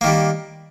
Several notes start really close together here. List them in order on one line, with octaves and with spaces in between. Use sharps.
A#3 D#3 G3